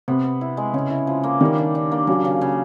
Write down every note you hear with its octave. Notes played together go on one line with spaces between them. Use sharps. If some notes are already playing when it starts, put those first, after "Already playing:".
C3 B3
B3
E4
G#3
C#3 C#4
E4
F3
A#3
D#3 G3
D4
D4
A#3
C#3 F#3
C#3
C#3